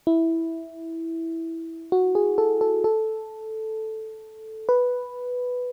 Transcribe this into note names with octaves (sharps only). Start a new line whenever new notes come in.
E4
F#4
G#4
A4
A4
A4
B4